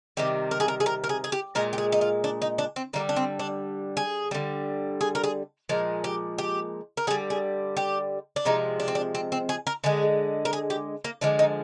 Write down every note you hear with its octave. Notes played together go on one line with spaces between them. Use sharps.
C3 D#3 G3 G4
A#4
G#4
A#4
G#4
A#4
A#4
G#4
G#4
G4
A#2 G#3 A#4
G4
G#4
D#4
F4
D4
D#4
D4
C4
D3 G3 A#3
D4
C4
D4
G#4
D3 G3
G#4
A#4
G#4
A#2 F3 G#3 A#4
G4
G4
A#4
D3 G3 G#4
G#4
G4
D4
C3 F3 G#3 D#4
D4
C4
D4
C4
C4
G#4
A#4
D3 G#3 G#4
A#4
G#4
G4
A#3
D3 F3 G#3 D4
D#4